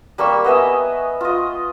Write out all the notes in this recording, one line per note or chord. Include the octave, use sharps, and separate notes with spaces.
G3 A#3 C#6 E6
B3 D#5 E5 G#5
F4 D#5